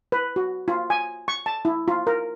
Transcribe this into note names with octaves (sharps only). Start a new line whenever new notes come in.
B4
F#4
F4
G#5
C#6
A5
E4
F4
A#4